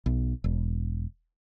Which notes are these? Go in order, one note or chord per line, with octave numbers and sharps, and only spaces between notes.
B1
E1